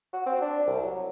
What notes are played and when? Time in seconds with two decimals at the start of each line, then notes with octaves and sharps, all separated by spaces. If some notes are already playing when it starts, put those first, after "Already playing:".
0.13 F#4
0.26 C4
0.41 D4
0.67 C2
0.83 F#3